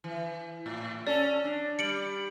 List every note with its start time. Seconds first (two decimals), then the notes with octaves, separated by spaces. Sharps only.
0.04 E3
0.66 A2
1.07 C#4 A4 D5
1.44 D4
1.79 G3 C#7 D7 F#7